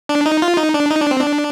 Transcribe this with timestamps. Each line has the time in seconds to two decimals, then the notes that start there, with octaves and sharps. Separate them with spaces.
0.09 D4
0.26 D#4
0.42 F4
0.57 D#4
0.74 D4
0.90 D#4
1.01 D4
1.11 C4
1.21 D4